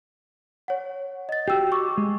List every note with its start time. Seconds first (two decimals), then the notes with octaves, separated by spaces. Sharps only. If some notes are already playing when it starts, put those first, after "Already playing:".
0.68 C#5 F#5
1.29 D#5 A6
1.48 F#4 G4 G5 E6
1.72 C#6 D6 E6
1.98 G#3